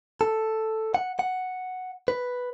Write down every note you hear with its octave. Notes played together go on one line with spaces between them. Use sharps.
A4
F#5
F#5
B4